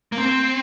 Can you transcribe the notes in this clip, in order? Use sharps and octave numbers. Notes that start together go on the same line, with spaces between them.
A#3
C4